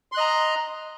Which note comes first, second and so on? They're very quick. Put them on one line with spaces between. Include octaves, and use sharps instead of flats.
C6 F#6 D#5 A#5